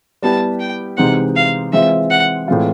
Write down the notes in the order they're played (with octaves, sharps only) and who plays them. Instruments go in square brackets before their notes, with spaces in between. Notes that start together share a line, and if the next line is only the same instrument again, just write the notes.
[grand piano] G3 B3 E4 G4 B4 [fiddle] A5
[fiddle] G5
[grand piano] C3 E3 G#3 C4 D#4 [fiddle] F#5
[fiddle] F5
[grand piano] E3 G#3 C4 F4 [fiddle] E5
[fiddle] F#5
[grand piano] A2 E3 G#3 C4 F4